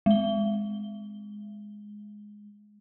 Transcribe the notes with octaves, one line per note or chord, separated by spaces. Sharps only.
G#3 G7